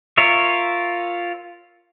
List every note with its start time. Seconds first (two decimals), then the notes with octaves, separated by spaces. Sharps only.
0.17 F4 A#4 C#5 E5